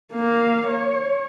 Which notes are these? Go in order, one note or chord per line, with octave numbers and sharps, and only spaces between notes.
A#3 F5
C#5